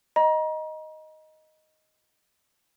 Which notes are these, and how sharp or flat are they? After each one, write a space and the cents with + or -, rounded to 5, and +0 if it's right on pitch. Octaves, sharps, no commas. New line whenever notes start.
D#5 +0 A#5 +35